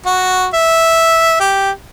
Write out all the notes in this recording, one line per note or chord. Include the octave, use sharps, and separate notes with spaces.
F#4
E5
G4